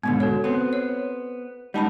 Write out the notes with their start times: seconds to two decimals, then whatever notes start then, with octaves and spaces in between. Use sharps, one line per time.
0.03 G#2 B2 D3 B3
0.20 F#4 A4 C#5
0.44 B3 C4
0.73 C#5
1.74 G3 G#3 D#4 A5 B5